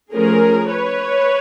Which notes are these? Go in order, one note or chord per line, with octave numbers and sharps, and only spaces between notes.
F3 A3 C#4 G#4 A#4
B4 C#5